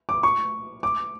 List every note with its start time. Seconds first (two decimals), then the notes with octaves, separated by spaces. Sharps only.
0.09 D6
0.23 C#6
0.83 D6